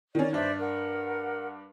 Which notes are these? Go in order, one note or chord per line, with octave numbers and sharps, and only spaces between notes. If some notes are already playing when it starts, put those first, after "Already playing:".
D#3 C#4 D5
G2 D4 C5 D5 E5
A#4 F#5